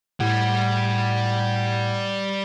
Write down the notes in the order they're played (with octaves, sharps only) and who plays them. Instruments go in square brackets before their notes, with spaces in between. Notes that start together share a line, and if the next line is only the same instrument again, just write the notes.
[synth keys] A2 F#5 G#6 [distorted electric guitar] G3 G4